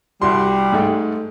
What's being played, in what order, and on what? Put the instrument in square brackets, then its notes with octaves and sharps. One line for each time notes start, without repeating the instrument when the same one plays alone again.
[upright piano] C2 F#4 C6 [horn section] G3
[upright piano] G#2 G#3 A3